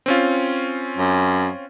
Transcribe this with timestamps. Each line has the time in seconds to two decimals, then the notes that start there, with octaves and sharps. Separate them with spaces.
0.06 C4 C#4 F4
0.97 F#2